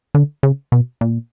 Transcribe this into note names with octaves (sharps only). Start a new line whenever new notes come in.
D3
C#3
B2
A#2